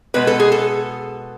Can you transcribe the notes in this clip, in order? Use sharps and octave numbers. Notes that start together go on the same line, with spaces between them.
B2 G#3 B3 B4
A4
G#4
A4